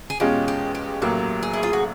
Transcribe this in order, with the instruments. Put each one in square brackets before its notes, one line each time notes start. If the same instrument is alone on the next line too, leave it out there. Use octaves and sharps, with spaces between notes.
[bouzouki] G#4
[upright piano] E2 B2 G#3 C#4 F4 [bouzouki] G4
[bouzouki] G4
G4
[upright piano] A1 A2 F#3 A#3 [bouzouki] G4
[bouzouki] G#4
E4
F4
F#4